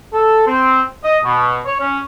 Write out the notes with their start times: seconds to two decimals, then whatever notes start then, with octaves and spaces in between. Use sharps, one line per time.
0.14 A4
0.47 C4
1.04 D#5
1.24 B2
1.66 C#5
1.81 C#4